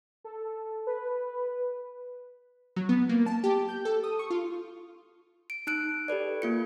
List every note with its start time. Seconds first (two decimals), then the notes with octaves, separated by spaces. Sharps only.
0.24 A4
0.87 B4
2.76 F#3
2.89 B3
3.09 A#3
3.26 A5
3.44 G4
3.69 G6
3.85 A4
4.04 D#6
4.19 C#6
4.31 F4
5.50 D7
5.67 D#4 F#6 D7
6.08 G4 A4 B4 D5
6.42 A#3 F4 C#7